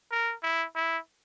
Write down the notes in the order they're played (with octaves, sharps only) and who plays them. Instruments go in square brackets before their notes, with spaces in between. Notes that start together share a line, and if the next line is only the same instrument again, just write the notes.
[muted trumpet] A#4
E4
E4